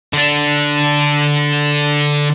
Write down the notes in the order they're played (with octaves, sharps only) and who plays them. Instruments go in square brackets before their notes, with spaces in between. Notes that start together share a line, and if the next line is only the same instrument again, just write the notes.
[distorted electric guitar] D3 D4